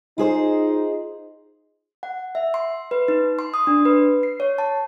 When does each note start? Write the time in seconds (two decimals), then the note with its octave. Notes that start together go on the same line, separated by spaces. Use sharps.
0.18 D#4 F4 G#4 C5
2.03 F#5
2.35 E5
2.54 C6
2.91 B4
3.08 D#4
3.39 C6
3.54 D#6
3.67 D4
3.85 B4
4.23 C7
4.40 C#5
4.58 A5